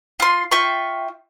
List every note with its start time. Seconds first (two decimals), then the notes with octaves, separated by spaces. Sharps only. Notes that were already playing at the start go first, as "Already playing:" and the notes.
0.20 F4 C6
0.51 F4 E5 G5 C#6